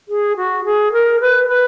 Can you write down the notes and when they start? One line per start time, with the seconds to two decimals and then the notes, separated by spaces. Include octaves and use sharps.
0.08 G#4
0.36 F#4
0.64 G#4
0.92 A#4
1.21 B4
1.48 B4